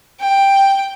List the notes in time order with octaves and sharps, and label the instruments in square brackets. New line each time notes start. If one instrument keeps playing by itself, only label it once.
[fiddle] G5